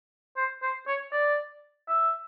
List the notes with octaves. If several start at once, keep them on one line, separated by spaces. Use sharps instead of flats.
C5
C5
C#5
D5
E5